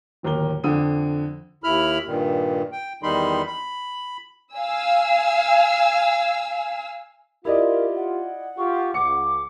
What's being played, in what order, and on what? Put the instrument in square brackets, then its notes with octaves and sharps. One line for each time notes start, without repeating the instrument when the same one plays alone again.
[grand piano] D1 D#2 A#4 G7
F2 D3 D#6 D#7
[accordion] D#2 E4 B5 F6
G2 A#2 D#3
G5
E2 D#3 G3 D#4 B5 C6
B5
[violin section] F5 G#5 E6
[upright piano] E4 D5 D#5 [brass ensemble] F4 [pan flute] G4 [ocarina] A#4
[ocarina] F#5
[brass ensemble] F4 G4 [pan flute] C#6
[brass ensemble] C#2 [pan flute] D6 [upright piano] C#7